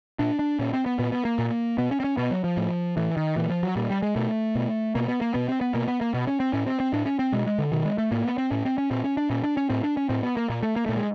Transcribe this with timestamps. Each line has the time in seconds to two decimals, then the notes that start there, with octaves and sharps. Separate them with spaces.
0.19 A#2 D4
0.39 D4
0.59 A#2 C#4
0.73 C4
0.86 B3
0.99 A#2 B3
1.12 B3
1.25 A#3
1.39 A#2
1.78 B2 B3
1.91 C#4
2.00 C4
2.04 C#4
2.17 B2 B3
2.31 F#3
2.44 F3
2.57 A2
2.97 A2 E3
3.17 D#3
3.36 A#2 E3
3.50 F3
3.63 F#3
3.76 A#2 G3
3.90 G3
4.02 G#3
4.16 B2 A3
4.55 B2
4.95 B2 A#3
5.08 B3
5.21 A#3
5.34 B2 B3
5.48 C4
5.61 B3
5.74 B2 A#3
5.88 B3
6.01 A#3
6.14 B2 B3
6.27 C#4
6.40 C4
6.53 A2 C#4
6.66 C4
6.80 C4
6.93 A2 D4
7.06 C#4
7.19 C4
7.32 B2 G#3
7.46 G#3
7.58 D3
7.72 B2 D#3
7.85 G#3
7.98 A3
8.11 A2 A#3
8.24 B3
8.38 C4
8.51 A2 C#4
8.65 C4
8.78 C#4
8.91 A#2 C4
9.04 C#4
9.17 D4
9.30 A#2 C#4
9.43 D4
9.57 C#4
9.70 A2 C4
9.83 D4
9.97 C#4
10.09 A2 C4
10.23 B3
10.37 A#3
10.50 A#2 A#3
10.63 A3
10.76 A#3
10.86 A#2 A3
10.97 G#3